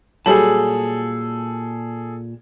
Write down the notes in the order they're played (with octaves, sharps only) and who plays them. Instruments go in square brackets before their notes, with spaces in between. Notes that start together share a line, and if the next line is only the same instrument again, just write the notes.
[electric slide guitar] A#2 A5 [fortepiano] F#3 G3 [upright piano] G#4 A4 F#7